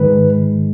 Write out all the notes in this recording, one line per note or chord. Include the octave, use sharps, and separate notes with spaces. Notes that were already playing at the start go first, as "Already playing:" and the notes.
Already playing: G#2 D#3 G#3 B4